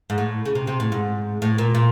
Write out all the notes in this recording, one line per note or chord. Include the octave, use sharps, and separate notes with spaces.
G#2
A2
C#3
C3
C3
A2
G#2
A2
A#2
A#2